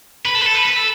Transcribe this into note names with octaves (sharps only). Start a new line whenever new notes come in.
B4
A4
B4
A4
B4
B4
A4